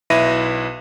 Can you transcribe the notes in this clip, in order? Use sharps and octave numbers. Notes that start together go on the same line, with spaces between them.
B1 E4 B4 E5 A#6 D#7